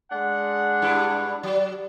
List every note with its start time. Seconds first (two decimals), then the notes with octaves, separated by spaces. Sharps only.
0.11 G#3 D4 F#5
0.82 G2 E4
1.43 F#3